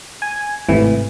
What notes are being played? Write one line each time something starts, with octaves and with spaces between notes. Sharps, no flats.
G#5
G#1 A2 C3 E3